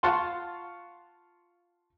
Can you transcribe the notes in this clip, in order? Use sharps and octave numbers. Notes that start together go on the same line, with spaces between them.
F4 F5 F#5 A5 C6 C#6